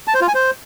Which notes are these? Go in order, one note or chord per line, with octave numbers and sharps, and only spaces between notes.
A5
C5
F4
G#5
C5